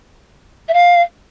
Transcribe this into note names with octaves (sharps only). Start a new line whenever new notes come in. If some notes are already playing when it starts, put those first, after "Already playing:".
E5
F5